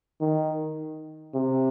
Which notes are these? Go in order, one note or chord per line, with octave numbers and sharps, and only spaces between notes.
D#3
C3